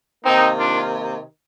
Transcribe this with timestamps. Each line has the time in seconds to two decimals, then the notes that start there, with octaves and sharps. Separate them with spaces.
0.25 C3 D#3 A#3 C4 D#4
0.56 D4 F4